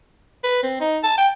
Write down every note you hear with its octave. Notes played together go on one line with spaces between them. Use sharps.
B4
C4
D#4
A5
G5